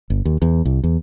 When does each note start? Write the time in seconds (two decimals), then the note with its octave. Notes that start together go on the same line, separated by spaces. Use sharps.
0.10 G1
0.25 D#2
0.42 E2
0.65 C2
0.84 E2